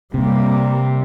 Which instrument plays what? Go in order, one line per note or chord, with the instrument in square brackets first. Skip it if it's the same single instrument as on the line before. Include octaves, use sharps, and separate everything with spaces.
[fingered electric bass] C3 [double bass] G3 A#3